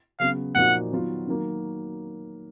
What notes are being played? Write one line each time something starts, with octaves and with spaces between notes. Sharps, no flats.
C#3 F#3 B3 F5
A#2 F3 A#3 D#4 F#4 F#5
D#3 F#3 B3 F4
D#3 F#3 A#3